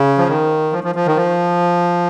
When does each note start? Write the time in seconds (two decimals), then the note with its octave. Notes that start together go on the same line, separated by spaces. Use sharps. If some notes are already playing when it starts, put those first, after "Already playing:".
Already playing: C#3
0.18 F3
0.28 D#3
0.73 F3
0.84 F3
0.95 F3
1.06 D#3
1.16 F3